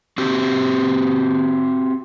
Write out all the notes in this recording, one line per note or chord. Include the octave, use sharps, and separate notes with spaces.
C4 F#4 G4